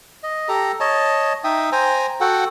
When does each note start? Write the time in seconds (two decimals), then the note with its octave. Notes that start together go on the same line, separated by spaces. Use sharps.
0.23 D#5
0.49 G4 A4 A#5
0.80 C#5 D#5 A5
1.44 D#4 E5 G5 D#6
1.72 C5 G5 G#5 A#5
2.21 F#4 A4 F#5 G5